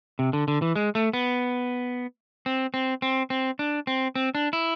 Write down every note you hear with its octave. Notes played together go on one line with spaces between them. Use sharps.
C3
D3
D3
E3
G#3
A3
B3
C4
C4
C4
C4
D4
C4
C4
D4
E4